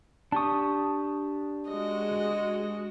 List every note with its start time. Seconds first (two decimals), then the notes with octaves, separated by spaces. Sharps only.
0.32 D4 G4 A5 C#6 D#6
1.68 G#3 F#4 D#5